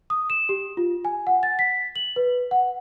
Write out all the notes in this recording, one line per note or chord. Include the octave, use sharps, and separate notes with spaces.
D#6
E7
G4
F4
G#5
F#5
A6
B6
F#7
B4
F#5